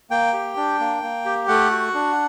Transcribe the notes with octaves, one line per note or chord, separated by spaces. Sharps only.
A#3 G5
G4
D4
A#3
A#3
G4
A3 F#5
F#4
D4